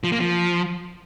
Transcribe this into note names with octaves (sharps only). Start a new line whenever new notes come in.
F3
A#3
F3